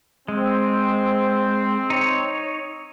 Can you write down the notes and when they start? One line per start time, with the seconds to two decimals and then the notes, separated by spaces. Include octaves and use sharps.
0.28 G#3 C4
1.90 D#4 C#5